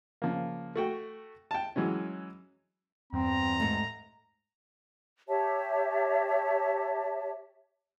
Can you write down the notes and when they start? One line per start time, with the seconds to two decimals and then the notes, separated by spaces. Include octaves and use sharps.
0.22 C#3 F3 A#3
0.76 A3 F#4 G5
1.51 G5 A5
1.76 E3 F#3 G#3 C#4
3.13 E2 G2 C4 A#5
3.60 G#2 A3
5.28 G4 C#5 E5 A5